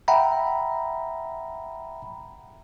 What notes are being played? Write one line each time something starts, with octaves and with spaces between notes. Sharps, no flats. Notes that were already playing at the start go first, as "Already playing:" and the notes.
E5 F#5 G5 A#5 B5